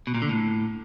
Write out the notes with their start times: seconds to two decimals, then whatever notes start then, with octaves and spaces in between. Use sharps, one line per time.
0.07 B2
0.14 A#2
0.22 D3
0.29 A2